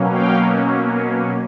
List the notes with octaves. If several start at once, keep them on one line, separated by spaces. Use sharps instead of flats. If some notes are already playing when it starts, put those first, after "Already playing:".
Already playing: B2 F#3 A#3 C#4
F5 G5